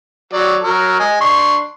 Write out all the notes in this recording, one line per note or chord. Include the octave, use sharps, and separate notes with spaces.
F#3 D5
F#3 A#4
D#5 G#5
D4 C6 C#6